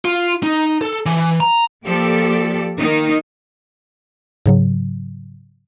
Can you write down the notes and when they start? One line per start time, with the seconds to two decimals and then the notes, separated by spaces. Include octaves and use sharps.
0.05 F4
0.43 D#4
0.81 A4
1.06 E3
1.40 A#5
1.86 F3 A#3 G4 A4 D5
2.78 D#3 A#3 D#4
4.46 G#2 C#3 F#3